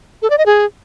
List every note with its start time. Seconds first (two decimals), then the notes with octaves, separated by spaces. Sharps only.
0.22 A4
0.30 D5
0.38 D#5
0.46 G#4